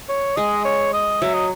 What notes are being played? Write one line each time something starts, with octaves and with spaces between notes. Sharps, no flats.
C#5
G#3 D#5
C#5
D#5
F#3 E5
D#5